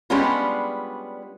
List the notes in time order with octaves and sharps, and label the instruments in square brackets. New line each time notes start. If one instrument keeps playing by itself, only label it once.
[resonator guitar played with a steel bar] G3 G#3 B3 C#4 D4 F4